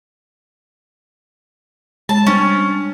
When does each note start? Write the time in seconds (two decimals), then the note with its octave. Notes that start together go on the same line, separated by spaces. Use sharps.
2.09 G#3 A5
2.27 G3 C#4 D4